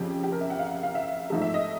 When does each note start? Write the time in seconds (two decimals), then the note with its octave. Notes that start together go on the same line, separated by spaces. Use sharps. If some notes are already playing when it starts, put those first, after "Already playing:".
Already playing: F2 C#3 F3 G4
0.24 G4
0.32 A#4
0.41 E5
0.50 F#5
0.59 F5
0.83 F5
0.95 E5
1.30 G#2 F3 A3 E5
1.42 E5
1.54 D#5